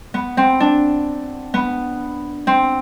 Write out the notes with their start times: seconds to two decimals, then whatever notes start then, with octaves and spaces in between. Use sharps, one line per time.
0.14 B3
0.37 C4
0.60 D4
1.54 B3
2.47 C4